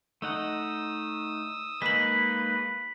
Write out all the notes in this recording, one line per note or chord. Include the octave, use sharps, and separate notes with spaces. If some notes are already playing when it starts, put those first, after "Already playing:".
A3 D#4 F#5 D#6 E6
G#3 A#3 D#4 B4 B6 F#7